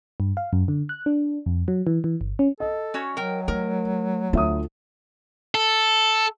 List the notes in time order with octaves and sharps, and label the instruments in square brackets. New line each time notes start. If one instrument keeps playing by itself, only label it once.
[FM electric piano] G2
F5
F#2
D3
F#6
D4
F2
F#3
E3
E3
G1
C#4
[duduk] A4 [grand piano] D#5
[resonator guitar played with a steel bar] C#4 F#4 C#5
[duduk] F#3 [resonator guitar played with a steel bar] A#4 G5
[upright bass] A3 [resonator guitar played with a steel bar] A#4
[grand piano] D2 E5 D#6 [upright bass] F4
[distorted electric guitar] A4